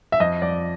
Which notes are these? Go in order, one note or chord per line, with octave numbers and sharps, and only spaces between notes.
E5
F2 D#5
F2 D5